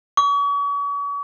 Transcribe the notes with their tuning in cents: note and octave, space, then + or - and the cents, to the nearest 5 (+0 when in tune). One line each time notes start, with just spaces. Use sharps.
C#6 +40